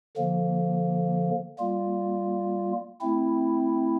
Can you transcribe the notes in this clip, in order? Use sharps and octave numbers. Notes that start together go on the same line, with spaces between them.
D3 F3 A#3
G3 A#3 F4
A3 C4 E4